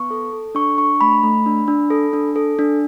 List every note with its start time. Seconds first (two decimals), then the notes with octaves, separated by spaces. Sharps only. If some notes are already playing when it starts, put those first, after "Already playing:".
Already playing: B3 C#6
0.11 A4
0.33 A4
0.55 D4 C#6
0.77 D4 C#6
1.01 A3 B5
1.23 A3
1.46 D4
1.68 D4
1.90 A4
2.13 D4
2.36 A4
2.59 D4